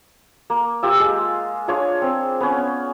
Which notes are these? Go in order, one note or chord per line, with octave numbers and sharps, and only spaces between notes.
A#3
F4 G4 E6
G#3
D4 F4 G#4 C#5
C4
B3 C#4